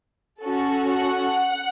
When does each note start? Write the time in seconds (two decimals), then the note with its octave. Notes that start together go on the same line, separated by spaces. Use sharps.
0.42 C#4 F#4 A4
0.92 F#5